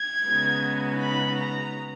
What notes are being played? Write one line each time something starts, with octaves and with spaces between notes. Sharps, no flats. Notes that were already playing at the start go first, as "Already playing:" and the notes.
Already playing: G#6
C#3 G#3 B3 D#4 F#4
B5
A#5